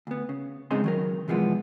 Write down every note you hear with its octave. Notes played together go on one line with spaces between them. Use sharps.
D2 B3
C#3
G#2 C#3 G#3 C4 D#4 C6
D#3 F#3 A#4
C3 E3 F3 G#3 B3